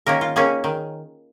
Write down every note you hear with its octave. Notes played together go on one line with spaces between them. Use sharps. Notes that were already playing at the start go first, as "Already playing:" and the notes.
D#3 A#3 C#4 A#4
F4
D#3 A#3 C#4 G#4
D#3